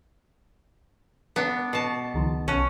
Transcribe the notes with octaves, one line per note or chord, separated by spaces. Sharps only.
B3 D4
B2 A5
C#2 D#3 F3
B1 C#4 A5 F#6